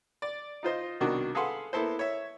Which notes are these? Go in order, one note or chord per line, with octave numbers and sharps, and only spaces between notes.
D5
D#4 F4 C5 D#5
C2 B2 D#3 D4 F#4
G#4 A4 B4 F5 F#5 C6
A#3 B3 E4 A4 C5
C#5 E5